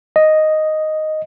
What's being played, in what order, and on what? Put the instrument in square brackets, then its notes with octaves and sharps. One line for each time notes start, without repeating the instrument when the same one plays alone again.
[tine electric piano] D#5